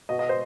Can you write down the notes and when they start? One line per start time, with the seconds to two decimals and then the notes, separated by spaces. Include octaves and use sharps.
0.09 B2 D#5
0.19 D#5
0.29 C5